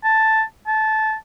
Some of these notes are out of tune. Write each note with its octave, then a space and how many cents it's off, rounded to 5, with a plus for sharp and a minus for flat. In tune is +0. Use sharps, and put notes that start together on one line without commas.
A5 +0
A5 -15